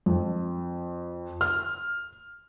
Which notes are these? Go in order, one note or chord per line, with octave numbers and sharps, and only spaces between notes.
F2
F6